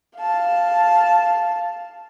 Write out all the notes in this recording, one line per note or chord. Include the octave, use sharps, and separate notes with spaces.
F5 A5